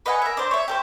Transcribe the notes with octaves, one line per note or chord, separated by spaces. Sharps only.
B4 D#5 F#5 G#5
A#4 E5
D4 C5
C#5 E5
G4 A4 C5